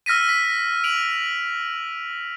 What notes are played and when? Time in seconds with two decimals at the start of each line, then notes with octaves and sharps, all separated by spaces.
0.06 E6 F6 A#6 B6 D#7
0.29 B6
0.84 D7 F7 F#7